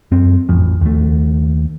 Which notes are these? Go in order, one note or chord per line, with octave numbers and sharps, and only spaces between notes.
F#2 C4
A1 F2 F3
D#2 A3